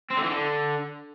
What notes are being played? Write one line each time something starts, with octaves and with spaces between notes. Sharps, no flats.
C4
D3
E3
D3